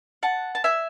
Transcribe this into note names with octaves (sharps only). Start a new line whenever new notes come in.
F#5 A5
A5
E5 G#5